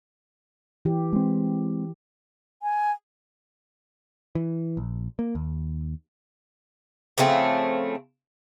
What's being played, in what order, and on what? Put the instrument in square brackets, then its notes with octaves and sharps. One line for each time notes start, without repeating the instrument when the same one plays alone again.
[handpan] E3 G4
[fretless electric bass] G#3 C4
[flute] G#5
[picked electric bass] E3
A#1
A#3
D#2
[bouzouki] C#3 F3 A3 C4